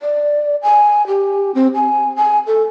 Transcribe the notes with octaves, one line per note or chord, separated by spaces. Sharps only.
D5
G#5
G4
C4
G#5
G#5
A4